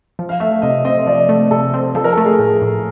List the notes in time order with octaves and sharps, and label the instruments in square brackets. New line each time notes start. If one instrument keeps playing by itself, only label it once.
[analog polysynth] F3
[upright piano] F5
[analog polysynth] A3 [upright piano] E5
[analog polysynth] C3 [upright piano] D#5
[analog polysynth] C4 [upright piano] D#5
[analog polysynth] F3 [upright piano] D5
[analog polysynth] A3
[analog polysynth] C3 [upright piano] A4
[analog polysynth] C4
[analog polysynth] F3 [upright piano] A4
[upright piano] A#4
[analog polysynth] A3 [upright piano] A4
[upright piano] G#4
[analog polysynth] A2
A2